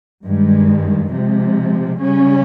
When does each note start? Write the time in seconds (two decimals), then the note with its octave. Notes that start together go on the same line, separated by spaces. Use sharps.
0.25 G2 D#3 G#3
1.12 C3 F3 G#3
2.00 C#3 G3 C#4